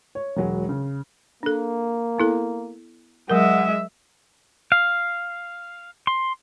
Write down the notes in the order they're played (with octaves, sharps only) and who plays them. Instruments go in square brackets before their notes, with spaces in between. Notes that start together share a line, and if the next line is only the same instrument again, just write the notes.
[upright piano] C#5
E1 F#3 G#3
C#3
[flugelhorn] A#3 [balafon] D4 A4
[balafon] B3 E4 A4
[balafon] F#3 A#4 [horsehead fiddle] G#3 E5 [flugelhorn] F#5
[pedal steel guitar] F5
C6